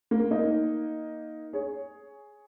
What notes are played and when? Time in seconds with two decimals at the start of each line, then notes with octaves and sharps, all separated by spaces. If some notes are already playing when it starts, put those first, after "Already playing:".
0.11 A#3
0.31 A#3 D#4
1.53 G#4 C#5